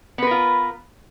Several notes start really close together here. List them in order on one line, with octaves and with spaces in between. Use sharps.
B3 B4 A#4 F4